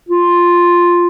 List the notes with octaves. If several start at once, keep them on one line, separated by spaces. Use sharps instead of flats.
F4